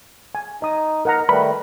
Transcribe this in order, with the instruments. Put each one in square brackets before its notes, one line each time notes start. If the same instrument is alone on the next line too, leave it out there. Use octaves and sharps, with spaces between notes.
[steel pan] G#5
[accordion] D#4 [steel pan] D#5 D#6
[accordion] D#4 [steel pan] A#4 F#5 A#5
[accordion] D#3 G3 A3 [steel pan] B4 [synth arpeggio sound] B5